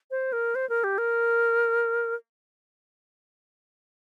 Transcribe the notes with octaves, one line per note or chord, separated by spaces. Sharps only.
C5
A#4
C5
A#4
G4
A#4